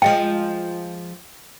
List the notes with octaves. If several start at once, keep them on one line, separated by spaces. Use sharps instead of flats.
F3 G#3 F4 G5